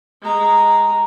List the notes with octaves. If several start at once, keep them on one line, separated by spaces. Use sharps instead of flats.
G#3 A#5